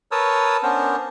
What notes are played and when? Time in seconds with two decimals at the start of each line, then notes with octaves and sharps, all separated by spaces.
0.12 A#4 B4 C#5 A5 D#6 E6
0.63 B3 C#4 D4 A#4 C5